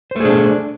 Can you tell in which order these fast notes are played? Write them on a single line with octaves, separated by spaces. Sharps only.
C5 A3 G#4 D4